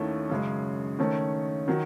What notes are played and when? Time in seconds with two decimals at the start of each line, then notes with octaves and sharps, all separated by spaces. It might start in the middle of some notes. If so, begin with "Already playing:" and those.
Already playing: D#2 D#3 A3 C#4 E4
0.30 F#2 C#3 G#3
0.99 D#3 A3 C#4
1.68 D#3 F#3